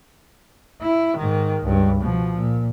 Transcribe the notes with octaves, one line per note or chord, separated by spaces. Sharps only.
E4
G#2 D#3
C#2 G2
B2 F3
A#2